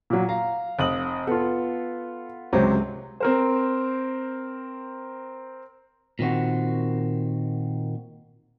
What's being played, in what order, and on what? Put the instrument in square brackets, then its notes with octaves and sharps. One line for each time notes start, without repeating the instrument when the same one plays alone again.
[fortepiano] A#2 F#3
F5 A#5
[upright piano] F1 D#6 F#7
[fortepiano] B3 F4 [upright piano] A4
[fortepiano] C#2 C3 C5 [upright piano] F#3 C4 G4
[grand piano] C4 A#4 C5
[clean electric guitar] A#2 D#3 C4 F#4